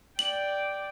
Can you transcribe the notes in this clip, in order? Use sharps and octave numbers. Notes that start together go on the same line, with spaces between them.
D5 G5 F#7